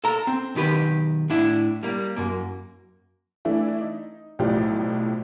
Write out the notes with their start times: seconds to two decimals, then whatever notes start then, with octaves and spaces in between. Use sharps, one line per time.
0.04 A4 A#5
0.27 C4
0.55 B1 D#3 G4 B4
1.30 A2 D4 E4
1.83 G3 A#3
2.16 F#2 A#3
3.45 E3 A3 D4 E4
3.81 D#4
4.39 B1 A2 F3 G4 D5